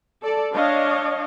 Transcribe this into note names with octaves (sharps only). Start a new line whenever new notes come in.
A4 D5
D4 C#5 D#5 F5